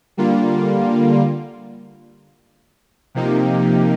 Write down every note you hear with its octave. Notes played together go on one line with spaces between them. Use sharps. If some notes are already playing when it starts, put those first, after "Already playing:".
D3 G3 A#3 F4
C3 F3 A#3 D#4 G4